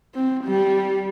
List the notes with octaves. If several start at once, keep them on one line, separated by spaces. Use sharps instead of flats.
C4
G3